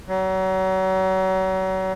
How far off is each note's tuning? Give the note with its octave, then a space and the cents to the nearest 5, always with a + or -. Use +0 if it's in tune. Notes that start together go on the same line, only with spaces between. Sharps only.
F#3 +35